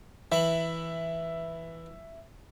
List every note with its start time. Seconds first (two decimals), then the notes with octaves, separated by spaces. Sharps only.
0.32 E3 E5 B5